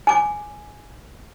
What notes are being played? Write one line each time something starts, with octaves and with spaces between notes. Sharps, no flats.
G#5 D6